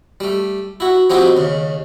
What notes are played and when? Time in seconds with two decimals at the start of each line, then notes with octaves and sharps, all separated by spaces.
0.20 G3 A3
0.80 E4 F#4
1.10 F3 C4 D#4 E4 F#4 G4
1.37 D#2 C#3